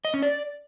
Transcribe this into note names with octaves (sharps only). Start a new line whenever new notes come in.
D#5
C#4
D5